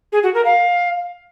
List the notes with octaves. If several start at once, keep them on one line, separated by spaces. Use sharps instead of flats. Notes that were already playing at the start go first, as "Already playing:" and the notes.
G#4
F#4
A#4
F5